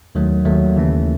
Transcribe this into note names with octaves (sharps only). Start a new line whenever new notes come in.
D#2 D#3 F#3 A3
D#2 D#3 F#3 A3
D#2 C#3 E3 A3 C#4